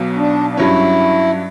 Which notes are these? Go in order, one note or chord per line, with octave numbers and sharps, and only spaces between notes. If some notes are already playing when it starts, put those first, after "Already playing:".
Already playing: B1 B2 F#3
D4
D4
G2 F#3 C#4 E4